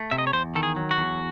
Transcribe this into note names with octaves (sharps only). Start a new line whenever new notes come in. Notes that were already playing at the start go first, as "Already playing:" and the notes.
Already playing: A3
C3 E5
D#5
C#5
E2 C5
D#3 A4
G#4
F#3
F#4
E2